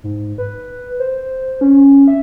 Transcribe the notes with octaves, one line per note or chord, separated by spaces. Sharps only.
G#2
B4
C5
C#4
E5